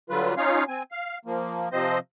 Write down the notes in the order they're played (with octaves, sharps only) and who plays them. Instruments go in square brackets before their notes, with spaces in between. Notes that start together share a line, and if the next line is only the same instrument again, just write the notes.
[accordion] D3 F#3 G3 F4 B4
C#4 D#4 F4 C#5 F5
C4 G#5
F5
F3 A#3
C3 F3 C4 C5 D#5